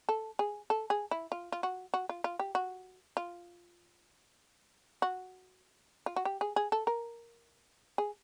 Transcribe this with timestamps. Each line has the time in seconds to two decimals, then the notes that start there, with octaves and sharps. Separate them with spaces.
0.09 A4
0.39 G#4
0.70 A4
0.90 G#4
1.11 E4
1.32 F4
1.52 F4
1.63 F#4
1.94 F#4
2.09 F4
2.24 F4
2.39 G4
2.55 F#4
3.17 F4
5.02 F#4
6.06 F4
6.16 F#4
6.25 G4
6.41 G#4
6.56 G#4
6.72 A4
6.87 A#4
7.98 G#4